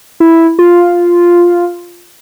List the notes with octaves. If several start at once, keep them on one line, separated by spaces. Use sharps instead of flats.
E4
F4